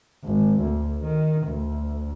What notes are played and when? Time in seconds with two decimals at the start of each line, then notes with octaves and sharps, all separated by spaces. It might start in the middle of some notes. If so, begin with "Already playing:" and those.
0.25 G#1
0.60 D2
1.03 D#3
1.47 D2